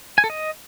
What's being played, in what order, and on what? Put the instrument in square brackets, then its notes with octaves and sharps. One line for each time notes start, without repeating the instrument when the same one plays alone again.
[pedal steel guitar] G#5
A4
D#5